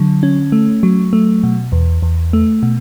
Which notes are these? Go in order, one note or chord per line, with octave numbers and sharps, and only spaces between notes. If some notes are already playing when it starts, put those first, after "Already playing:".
Already playing: D3 F#3
C#4
A3
F#3
A3
B2
E2
E2
A3
B2